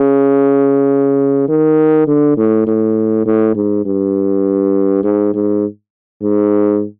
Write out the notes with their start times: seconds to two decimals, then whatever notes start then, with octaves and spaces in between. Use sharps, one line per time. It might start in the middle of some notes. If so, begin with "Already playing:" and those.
Already playing: C#3
1.49 D#3
2.08 D3
2.37 A2
2.67 A2
3.26 A2
3.56 G#2
3.86 G2
5.04 G#2
5.34 G#2
6.22 G#2